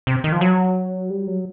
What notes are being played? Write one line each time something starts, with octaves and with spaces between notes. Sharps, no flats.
C3
D#3
F3
F#3
G3
F#3